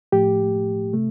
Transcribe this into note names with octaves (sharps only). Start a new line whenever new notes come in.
A2 F3 A3 G4
C3 A3